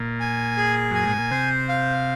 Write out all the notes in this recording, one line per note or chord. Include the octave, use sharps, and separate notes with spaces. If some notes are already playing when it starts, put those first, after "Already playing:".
Already playing: A#2
G#5
G#4
F#2 G#5
G#2
A#2
C3 C5
F5